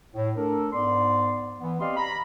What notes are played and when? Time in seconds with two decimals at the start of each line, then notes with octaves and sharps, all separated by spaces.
0.14 A2
0.36 A3 D4 A4 A#4
0.72 G#2 B3 D5 C6
1.60 E3 B3
1.80 C4 G4 D5 D#5 F5 C6
1.97 A#5 B5